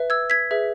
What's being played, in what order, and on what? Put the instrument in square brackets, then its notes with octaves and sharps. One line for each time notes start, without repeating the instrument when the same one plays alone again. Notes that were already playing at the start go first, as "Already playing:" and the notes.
Already playing: [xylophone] B4 E5
E6 G#6
G#6 B6
G#4 B4 E5